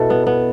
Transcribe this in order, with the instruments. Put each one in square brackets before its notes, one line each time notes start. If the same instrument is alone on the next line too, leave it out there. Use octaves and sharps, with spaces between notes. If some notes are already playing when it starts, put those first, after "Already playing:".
Already playing: [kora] B2 [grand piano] E4 A4 E5 A5
[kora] B3
B3